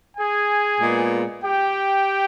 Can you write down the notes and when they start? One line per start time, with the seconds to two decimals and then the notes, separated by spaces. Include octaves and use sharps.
0.16 G#4 G#5
0.80 A#2 G#3 B3
1.43 G4 G5